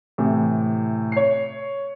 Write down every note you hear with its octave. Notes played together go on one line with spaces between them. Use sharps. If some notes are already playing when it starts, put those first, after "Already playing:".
A2 C3 E3
C#5 C7